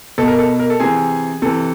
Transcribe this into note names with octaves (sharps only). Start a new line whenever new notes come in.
B2 A4
A#4
A4
A#4
A4
C3 E3 G#4
C3 E3 A4